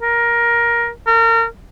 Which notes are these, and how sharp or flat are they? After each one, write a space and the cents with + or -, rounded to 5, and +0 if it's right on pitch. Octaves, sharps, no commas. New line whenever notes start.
A#4 +15
A#4 -30